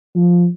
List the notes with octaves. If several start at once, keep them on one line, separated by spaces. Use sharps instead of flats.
F3